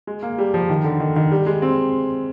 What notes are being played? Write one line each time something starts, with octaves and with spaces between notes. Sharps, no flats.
G#3
A#3
G3
F3
D#3
D3
D#3
D#3
G3
G#3
C4